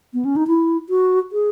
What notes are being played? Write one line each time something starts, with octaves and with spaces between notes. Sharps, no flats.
B3
C#4
D#4
E4
F#4
G#4